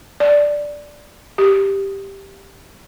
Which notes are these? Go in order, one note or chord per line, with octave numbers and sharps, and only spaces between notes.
D5
G4